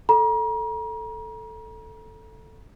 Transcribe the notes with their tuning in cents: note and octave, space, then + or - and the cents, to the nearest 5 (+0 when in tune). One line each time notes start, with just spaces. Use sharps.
A4 +0 A#5 +35